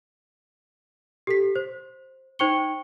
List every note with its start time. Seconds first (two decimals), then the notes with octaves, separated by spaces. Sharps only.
1.27 G4 A4 B6
1.56 C5
2.39 D#4 C5 G5 C#6 C#7 G7